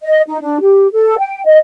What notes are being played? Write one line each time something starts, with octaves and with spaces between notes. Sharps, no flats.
D#5
D#4
D4
G4
A4
G5
D#5